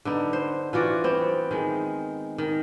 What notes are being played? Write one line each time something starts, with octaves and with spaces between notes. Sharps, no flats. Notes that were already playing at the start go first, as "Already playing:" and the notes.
D3 B3 D#4
C5
E3 F4 F#4 D5
B3 C4
D#3 G#3
D#3